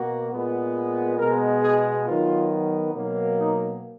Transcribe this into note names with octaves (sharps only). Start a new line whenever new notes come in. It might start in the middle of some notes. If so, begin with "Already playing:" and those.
Already playing: B2 A#3 F#4
A#2 G#3 B3
B2 G#3 B3 A#4
G#4
D#3 F#3 B3 F4
B2 F#3 A#3
D#4